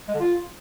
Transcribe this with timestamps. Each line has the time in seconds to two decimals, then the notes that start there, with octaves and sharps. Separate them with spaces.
0.08 G#3
0.14 D3
0.20 F4